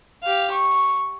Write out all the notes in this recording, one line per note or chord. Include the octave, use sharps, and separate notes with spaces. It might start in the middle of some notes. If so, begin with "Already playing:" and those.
G4 F5
C#6